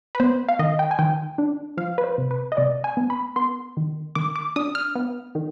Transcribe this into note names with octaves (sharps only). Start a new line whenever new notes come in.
B4
B3 C5
F5
D#3 D#5
G5
G#5
D#3 G5
D4
F3 F5
B4
C5
C3
B4
D#5
C3 D5
G#5
B3
B5
B3 C6
D#3
D#3 D6
D6
D4 D#6
F6
B3
D#3